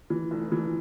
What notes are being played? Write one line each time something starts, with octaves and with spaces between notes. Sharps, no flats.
E3
F1
E3